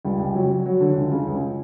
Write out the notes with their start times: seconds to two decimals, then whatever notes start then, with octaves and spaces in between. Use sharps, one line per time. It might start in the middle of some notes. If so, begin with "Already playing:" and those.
0.05 C#2 G3
0.20 C#2
0.35 F#3
0.50 F#3
0.66 F#3
0.80 D3
0.96 C#2
1.11 C#3
1.27 C#2